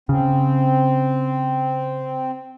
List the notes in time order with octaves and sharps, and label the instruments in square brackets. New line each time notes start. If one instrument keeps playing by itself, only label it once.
[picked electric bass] C#3 [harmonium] C4